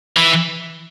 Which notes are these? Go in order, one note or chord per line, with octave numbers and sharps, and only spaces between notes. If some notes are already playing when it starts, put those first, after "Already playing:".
E3